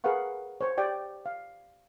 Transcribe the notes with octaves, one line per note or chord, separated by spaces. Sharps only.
G#4 A#4 B4 F5 F#5 C#6
C5 C#5
G4 D5 G5
F5